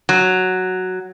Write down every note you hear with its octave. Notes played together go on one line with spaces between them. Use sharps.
F#3